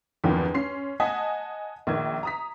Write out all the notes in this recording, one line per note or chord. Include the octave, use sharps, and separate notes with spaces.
E2 G2 D#3 F3 C4
C#4 C6 C7
D#5 F#5 G#5 A5 D#6 B6
A#1 D#3 G#6
A#5 D#6 B6